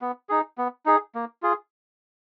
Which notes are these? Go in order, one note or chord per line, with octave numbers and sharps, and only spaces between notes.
B3
D#4 G#4
B3
D#4 G#4
A#3
F4 G#4